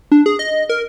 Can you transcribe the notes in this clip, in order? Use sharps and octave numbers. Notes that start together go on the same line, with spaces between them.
D4
G#4
D#5
A#4